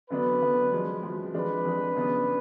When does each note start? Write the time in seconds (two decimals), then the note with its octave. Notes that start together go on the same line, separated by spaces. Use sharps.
0.10 D3 F#3 B3 D4 B4
0.42 D3 F#3 B3 D4
0.73 F#2 F3 G#3
1.03 F#2 F3 G#3
1.34 F2 F3 G#3 D4 B4
1.65 F2 F3 G#3 D4
1.96 F#2 C#3 F#3 B3 D4